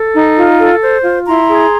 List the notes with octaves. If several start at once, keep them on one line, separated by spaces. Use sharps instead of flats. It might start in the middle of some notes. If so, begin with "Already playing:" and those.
Already playing: A4
D#4
F4
A4
C5
F4
E4 A#5 C6
G#4